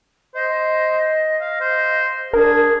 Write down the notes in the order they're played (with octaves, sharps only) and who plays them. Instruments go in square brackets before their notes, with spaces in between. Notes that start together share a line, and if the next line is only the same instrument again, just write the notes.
[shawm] C5 [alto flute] D#5
[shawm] F5
C5
[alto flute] D4 [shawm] G#4 [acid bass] A#4